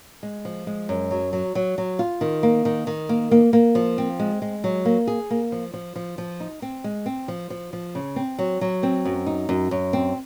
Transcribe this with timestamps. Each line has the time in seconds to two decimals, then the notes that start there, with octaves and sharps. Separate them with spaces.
0.23 G#3
0.45 F3
0.67 G#3
0.89 F#2
1.11 F#3
1.33 F#3
1.55 F#3
1.78 F#3
1.99 F4
2.21 D#3
2.43 A#3
2.65 D#3
2.87 D#3
3.09 A#3
3.31 A#3
3.53 A#3
3.75 F3
3.98 C4
4.19 G#3
4.42 G#3
4.64 F#3
4.85 A#3
5.07 G#4
5.30 A#3
5.52 F3
5.73 F3
5.96 F3
6.18 F3
6.40 D#4
6.62 C4
6.84 G#3
7.06 C4
7.28 F3
7.50 F3
7.73 F3
7.95 C#3
8.16 C4
8.39 F#3
8.61 F#3
8.83 C4
9.05 F#2
9.26 D#4
9.49 F#2
9.71 F#2
9.93 C4